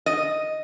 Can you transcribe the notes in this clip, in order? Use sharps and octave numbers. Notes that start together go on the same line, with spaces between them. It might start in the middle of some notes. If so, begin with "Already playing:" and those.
D#5